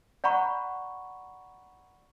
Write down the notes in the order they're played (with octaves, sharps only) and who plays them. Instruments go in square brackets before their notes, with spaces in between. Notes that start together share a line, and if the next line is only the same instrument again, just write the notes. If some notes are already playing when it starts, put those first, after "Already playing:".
[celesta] D5 F#5 A#5 B5 C#6